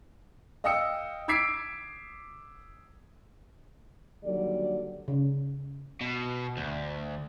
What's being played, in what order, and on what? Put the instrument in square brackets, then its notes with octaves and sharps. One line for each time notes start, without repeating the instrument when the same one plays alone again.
[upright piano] D#5 F5 G5 D#6 E6 C#7
D6 E6 G#6 B6 C7 D7
[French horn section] D#2 D3 F#3 G3 A4 D5
[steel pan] C#3
[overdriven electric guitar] B2
D2